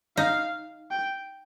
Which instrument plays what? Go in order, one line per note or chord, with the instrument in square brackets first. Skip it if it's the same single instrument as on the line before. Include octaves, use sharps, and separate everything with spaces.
[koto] D#4 [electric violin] F5
[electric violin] G5